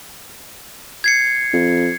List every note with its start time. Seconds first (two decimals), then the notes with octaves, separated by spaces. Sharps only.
1.04 G#6 C7 C#7
1.53 F2